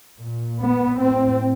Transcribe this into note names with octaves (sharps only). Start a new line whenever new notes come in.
A#2
B3
A2 C4